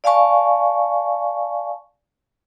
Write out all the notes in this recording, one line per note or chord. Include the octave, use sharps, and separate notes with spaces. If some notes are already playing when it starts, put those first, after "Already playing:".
D5 F5 G#5 A5 C#6